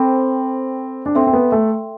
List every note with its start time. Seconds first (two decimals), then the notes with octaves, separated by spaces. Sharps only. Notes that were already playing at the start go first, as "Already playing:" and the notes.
Already playing: C4 A4 C5 G5 B5 D6
1.06 D4
1.15 C4 A4 E5 G5 C6
1.27 C4
1.33 B3
1.52 A3